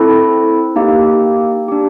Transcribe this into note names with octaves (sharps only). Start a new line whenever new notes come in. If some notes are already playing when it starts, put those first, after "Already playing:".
Already playing: C4 E4 A4
A#3 D#4 G4
D4 G4